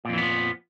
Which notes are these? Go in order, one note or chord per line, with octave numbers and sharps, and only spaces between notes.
F2 A#2 E3 F3 B3